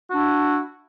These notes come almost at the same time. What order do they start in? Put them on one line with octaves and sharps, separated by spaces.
F#4 D4 E4